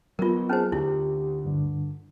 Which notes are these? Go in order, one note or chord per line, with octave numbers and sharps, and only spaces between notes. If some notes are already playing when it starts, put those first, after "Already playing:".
F#3 B3 F4 A#4
C#4 G#4 C5 A5 F6
D2 E4 G4
G2 D3